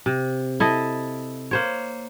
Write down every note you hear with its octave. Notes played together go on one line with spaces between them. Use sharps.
C3
E4 A4 D#5
A#3 C5 C#5